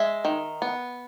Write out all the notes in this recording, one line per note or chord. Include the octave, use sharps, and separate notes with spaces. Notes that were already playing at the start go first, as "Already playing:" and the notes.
Already playing: G#3 E5
D#3
B3